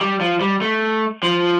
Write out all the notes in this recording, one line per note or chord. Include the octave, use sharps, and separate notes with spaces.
G3
F3
G3
A3
F3